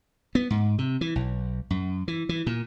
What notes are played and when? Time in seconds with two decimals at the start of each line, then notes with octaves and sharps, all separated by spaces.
0.35 B3
0.50 G#2
0.78 C3
1.01 E3
1.15 B1
1.70 F#2
2.08 E3
2.29 E3
2.47 A#2